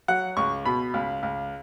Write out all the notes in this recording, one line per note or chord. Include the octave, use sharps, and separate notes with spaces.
F#3 F#5
C#2 C#6
B2 B5
C#2
C#2